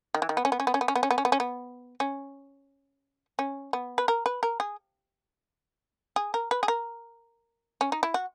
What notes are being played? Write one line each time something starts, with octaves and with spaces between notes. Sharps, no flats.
D#3
E3
D#3
B3
C#4
B3
C#4
B3
C#4
B3
C#4
B3
C#4
B3
C#4
B3
C#4
B3
C#4
C#4
B3
B4
A#4
B4
A#4
G#4
G#4
A#4
B4
G#4
A#4
C#4
D#4
E4
F#4